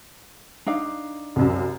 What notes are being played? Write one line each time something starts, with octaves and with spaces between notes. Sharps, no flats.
D4 D#4 F5
C2 F#2